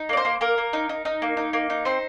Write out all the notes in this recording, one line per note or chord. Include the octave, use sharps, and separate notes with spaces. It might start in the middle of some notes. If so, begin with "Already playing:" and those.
Already playing: D#4
A#3 D5
C5
A#3
A#3 A#4
A#3
D#4
D#4
D#4
A#3
D#4
A#3
D#4
C4 C5